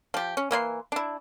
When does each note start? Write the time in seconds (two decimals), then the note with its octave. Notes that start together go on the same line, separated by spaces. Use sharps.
0.14 F3 G4
0.37 C#4
0.51 E3 A#3 D5 C6
0.92 D4 E4